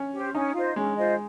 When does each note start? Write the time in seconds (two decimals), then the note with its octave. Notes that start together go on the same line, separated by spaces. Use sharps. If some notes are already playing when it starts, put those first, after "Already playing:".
Already playing: C#4
0.13 G4 C5
0.34 C#4 D#4
0.55 F4 C5 D#5
0.76 G#3 C#4
0.97 F4 C5 D#5